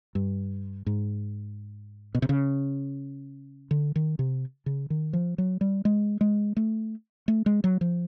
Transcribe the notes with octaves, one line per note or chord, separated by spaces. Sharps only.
G2
G#2
B2
C3
C#3
D3
D#3
C3
C#3
D#3
F3
F#3
G3
G#3
G#3
A3
A3
G#3
F#3
F3